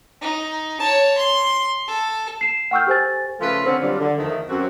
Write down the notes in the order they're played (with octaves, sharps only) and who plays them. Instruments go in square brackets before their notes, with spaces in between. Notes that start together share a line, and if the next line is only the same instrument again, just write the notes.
[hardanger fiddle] D#4
C#5 A5
C6
A4
[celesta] C7 E7
F#5 G5 C#6 E6 F6 G6
G4 A4 C5 G#5 A6
[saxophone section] C#3 F3 A3 F4 A4 B4
D3 C4 C#4
G2 D3 F#3 G3 F4 D5
D3
E2 D#3 F3 A3
F#2 C4 F#4